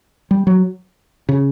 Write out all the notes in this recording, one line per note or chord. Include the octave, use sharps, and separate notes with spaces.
G3
F#3
C#3